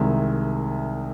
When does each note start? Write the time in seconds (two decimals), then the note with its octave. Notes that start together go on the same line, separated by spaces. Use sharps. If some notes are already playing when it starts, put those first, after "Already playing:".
Already playing: C2 C3 D#3 G#3 E5